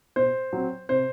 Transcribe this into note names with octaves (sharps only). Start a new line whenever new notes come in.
B2 C5
F#3 C4
C3 C5